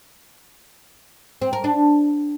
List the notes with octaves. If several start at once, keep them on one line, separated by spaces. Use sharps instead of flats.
C4
A#4
D4